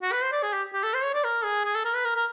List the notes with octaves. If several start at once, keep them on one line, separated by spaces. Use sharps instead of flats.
F#4
B4
C5
D5
G#4
G4
G4
A4
C5
C#5
D5
A#4
G#4
G#4
A4
A#4
B4
A#4
A#4